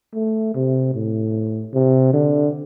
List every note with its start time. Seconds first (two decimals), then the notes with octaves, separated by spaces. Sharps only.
0.15 A3
0.54 C3
0.94 A2
1.74 C3
2.13 D3